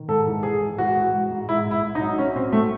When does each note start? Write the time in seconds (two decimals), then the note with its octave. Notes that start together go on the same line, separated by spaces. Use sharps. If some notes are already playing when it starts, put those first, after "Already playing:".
Already playing: D#3
0.08 G#2 A4
0.27 E3
0.43 E3 G#4
0.61 G#2
0.78 E3 F#4
0.96 G#2
1.13 G#2
1.31 G#2
1.48 G#2 E4
1.65 G#2
1.71 E4
1.83 G#2
1.95 D#4
2.00 F#3
2.18 F#3 C#4
2.36 F#3 C4
2.52 A3